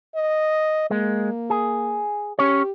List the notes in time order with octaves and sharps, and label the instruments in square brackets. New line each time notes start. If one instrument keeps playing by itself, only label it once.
[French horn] D#5
[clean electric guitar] G#3 [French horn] A#3
[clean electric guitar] G#4
[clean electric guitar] C#4 C#5 [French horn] G4